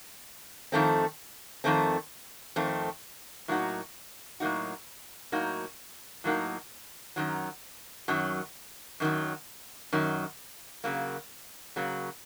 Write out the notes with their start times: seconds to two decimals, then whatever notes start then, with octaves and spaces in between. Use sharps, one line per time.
0.72 F2 D#3 A3 C4
1.64 F2 D#3 A3 C4
2.56 F2 D#3 A3 C4
3.48 A2 F#3 A#3 D#4 F#4
4.40 A2 F#3 A#3 D#4 F#4
5.32 A2 F#3 A#3 D#4 F#4
6.24 A2 F#3 A#3 D#4 F#4
7.16 F#2 D#3 F#3
8.08 F#2 D#3 F#3
9.00 F#2 D#3 F#3
9.93 F#2 D#3 F#3
10.84 C#3 F#3 A#3
11.76 C#3 F#3 A#3